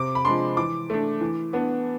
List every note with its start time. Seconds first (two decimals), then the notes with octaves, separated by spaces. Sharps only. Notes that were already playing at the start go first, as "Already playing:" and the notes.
Already playing: C3 D6
0.15 B5
0.25 F3 G#3 D4 C6
0.57 E3 D6
0.90 A3 D4
1.21 E3
1.53 B3 D4